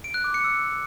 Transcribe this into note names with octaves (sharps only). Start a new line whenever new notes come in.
D7
F#6
D6
C#7
E6